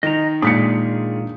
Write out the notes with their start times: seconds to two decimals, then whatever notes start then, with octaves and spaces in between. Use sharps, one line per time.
0.03 D#3 D#5 A#5
0.42 A#2 G#3 D4 G#4 D#6 B6 C#7